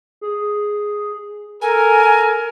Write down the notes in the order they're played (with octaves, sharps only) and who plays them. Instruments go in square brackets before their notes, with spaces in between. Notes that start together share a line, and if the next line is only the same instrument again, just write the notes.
[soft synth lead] G#4
[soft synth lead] A4 [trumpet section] A#4 [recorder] G#5